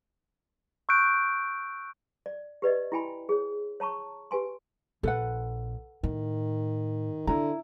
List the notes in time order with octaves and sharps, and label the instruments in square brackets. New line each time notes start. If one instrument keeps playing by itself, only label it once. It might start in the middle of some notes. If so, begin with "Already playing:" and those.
[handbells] C#6 E6 F#6 G6 D7
[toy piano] D5
G4 B4 D5 D#5
E4 F#4 G5 G#5 B5
G#4 C#5
C#5 A5 A#5 C#6
G4 B4 G#5 C6
[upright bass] A#1 [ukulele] A4 B4 F#5
[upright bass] A2 [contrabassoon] D#3
[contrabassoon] D3 [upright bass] D4 [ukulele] E4 A#5